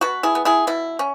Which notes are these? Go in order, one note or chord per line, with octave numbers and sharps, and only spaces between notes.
B2 F#4 B4
E4 G#4
B3
E4 G#4
B2 E4
C#4